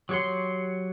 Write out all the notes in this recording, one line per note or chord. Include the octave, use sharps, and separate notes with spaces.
F#3 G4 C#5 F#5 C6